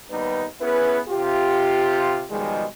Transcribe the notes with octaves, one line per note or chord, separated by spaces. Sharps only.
D#2 G3 B3 D#4 B4
B3 C#4 E4 G#4 B4
C3 F4 G4
B2 D#3 F3 G3 G#3